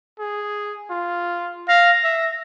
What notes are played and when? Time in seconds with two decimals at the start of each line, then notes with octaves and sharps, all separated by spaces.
0.19 G#4
0.90 F4
1.68 F5 A#6
2.04 E5